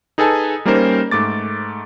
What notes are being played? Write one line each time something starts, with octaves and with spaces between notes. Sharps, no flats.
D#4 G#4 A4 B4 G#5 A5
G3 A#3 C#4 D#4 A#4 C5
G#2 A3 D6 A6